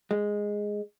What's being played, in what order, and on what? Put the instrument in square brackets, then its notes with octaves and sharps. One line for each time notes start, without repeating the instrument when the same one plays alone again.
[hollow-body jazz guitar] G#3